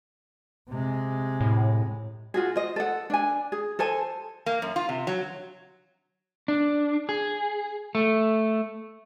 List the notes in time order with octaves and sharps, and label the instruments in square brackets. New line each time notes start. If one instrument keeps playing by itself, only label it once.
[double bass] C3 G#3
[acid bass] A2
[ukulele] F4 F#4 G#4
C5 D#5
A4 F#5
D4 G#5
G#4
A4 C5 G#5 A5
[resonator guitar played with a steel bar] A#3
F#2
F4
C3
F#3
[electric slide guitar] D4
G#4
A3